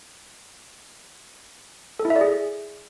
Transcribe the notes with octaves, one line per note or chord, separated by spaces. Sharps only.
A4
E4
E5
D5
G#4